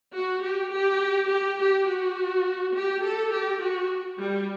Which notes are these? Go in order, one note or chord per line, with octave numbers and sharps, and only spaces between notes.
F#4
G4
G4
G4
G4
F#4
G4
A4
G4
F#4
G3